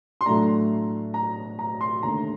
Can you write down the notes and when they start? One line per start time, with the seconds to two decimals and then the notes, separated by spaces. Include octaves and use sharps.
0.21 C6
0.26 A2 F#3 A3 D4 A#5
1.14 A#5
1.59 A#5
1.81 C6
2.03 D#2 D3 A3 A#5